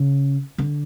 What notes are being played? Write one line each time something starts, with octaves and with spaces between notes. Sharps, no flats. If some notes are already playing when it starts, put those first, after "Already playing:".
Already playing: C#3
D3